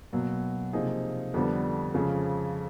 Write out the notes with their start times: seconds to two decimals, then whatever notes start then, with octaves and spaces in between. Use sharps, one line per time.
0.13 B2 F#3 A#3
0.73 C3 F3 A#3 D#4 G#4
1.34 F2 D3 G3 B3
1.94 F2 C#3 F3 G#3 C#4